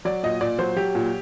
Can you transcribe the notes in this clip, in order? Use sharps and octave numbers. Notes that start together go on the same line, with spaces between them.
F#3 D5
A#2 D#5
A#2 D5
F#3 C5
F#3 G4
A#2